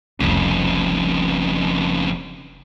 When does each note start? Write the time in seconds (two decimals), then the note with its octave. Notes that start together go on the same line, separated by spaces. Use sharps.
0.20 F1 C2 F2 C#3